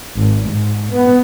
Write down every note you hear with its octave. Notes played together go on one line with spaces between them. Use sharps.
G#1
G#2
B3